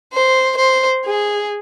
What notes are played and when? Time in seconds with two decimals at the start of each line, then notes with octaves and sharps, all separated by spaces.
0.13 C5
0.57 C5
1.05 G#4